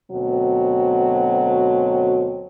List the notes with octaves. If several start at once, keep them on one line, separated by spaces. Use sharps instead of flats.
D2 B2 F#3 C4